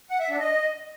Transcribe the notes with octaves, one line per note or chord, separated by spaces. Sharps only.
F#5
E5
D4
D#5